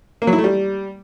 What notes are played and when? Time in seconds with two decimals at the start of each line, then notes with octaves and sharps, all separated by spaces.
0.22 A#3
0.27 F#3
0.33 E4
0.38 A3
0.44 G3